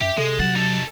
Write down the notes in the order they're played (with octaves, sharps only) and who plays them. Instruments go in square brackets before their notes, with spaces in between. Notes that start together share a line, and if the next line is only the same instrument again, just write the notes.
[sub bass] F#2 [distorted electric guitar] G4 [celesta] E5
[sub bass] C3 [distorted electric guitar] G#3 [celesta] A4
[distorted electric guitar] D2 F#5 [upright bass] F#3 [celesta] A6 E7
[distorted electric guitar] D#4 A4